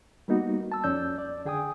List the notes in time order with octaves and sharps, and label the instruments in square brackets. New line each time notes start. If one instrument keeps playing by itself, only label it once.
[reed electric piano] G3 A#3 B3 D#4 F#4
A5 E6
F2 C#4 D5 E6 G6
D5
D3 G#4 G5 G#5 D#6